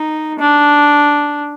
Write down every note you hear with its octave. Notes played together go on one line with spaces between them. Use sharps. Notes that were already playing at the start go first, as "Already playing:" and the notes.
Already playing: D#4
D4